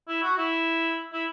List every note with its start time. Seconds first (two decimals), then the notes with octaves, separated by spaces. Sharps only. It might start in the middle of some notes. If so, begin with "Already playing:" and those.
0.09 E4
0.23 F#4
0.38 E4
1.13 E4